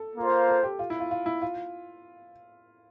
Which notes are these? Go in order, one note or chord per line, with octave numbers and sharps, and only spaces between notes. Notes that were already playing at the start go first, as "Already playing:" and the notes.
Already playing: A4
A#3 F4 C5
A4
G4
F4
E4
F4
F4
E4
F4